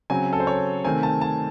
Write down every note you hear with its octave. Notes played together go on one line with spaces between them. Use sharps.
C#3 F#3 C4 G#5
A4
C5
C#5
C3 D#3 A3 C4 G#5
A5
A5